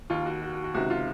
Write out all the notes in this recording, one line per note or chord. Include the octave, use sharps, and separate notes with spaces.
D#2 D#3 F4 F5
F#4
F#4
F#4
F#4
C#2 C3 D#3 F#4
F4